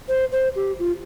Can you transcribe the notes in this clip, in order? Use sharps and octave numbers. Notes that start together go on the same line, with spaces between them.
C5
C5
G4
F4